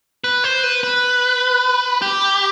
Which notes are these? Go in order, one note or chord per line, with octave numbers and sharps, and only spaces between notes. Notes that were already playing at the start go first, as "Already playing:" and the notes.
B4
C5
B4
B4
G4